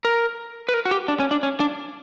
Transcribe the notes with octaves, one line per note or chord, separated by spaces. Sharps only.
A#4
B4
A#4
F#4
G4
D4
C#4
D4
C#4
D4